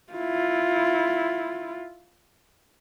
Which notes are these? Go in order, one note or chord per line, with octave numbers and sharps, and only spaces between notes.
E4 F4